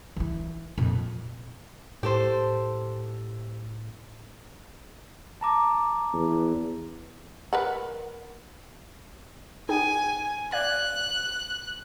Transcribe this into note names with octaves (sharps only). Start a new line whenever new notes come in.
E3 E4
F2 A#2
A2 G4 A4 C5
A5 A#5 D6
E2
A#4 B4 F#5
D#4 G#4 G5 G#5
D5 F5 F#6 G#6